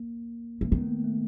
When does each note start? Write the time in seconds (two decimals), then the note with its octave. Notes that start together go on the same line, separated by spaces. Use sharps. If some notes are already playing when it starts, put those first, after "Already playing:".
Already playing: A#3
0.61 E3 A#3
0.71 D#3 B3
0.81 A3
0.87 A#3
1.04 A3